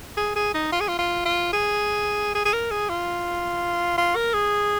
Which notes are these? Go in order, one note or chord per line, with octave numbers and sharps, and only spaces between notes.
G#4
G#4
D#4
F4
G#4
F4
F4
F4
G#4
G#4
G#4
A#4
G#4
F4
F4
A#4
G#4